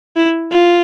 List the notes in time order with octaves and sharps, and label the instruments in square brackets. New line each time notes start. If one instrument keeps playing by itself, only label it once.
[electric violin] E4
F4